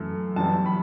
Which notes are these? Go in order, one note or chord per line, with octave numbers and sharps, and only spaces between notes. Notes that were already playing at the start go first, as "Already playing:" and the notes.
Already playing: F#2 E3 A3
F#2 E3 G3 A5
B5